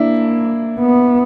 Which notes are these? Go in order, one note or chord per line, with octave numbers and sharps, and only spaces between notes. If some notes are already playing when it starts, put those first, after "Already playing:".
Already playing: A#3 D4 E4
B3